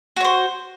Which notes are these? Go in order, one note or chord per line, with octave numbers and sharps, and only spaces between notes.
F#4 C5 C#5